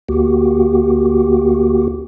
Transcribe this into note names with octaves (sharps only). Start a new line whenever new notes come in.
D2 A#3 F#4 G4